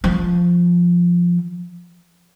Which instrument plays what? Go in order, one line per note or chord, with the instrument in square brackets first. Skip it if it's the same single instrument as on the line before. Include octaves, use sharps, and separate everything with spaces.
[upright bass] F3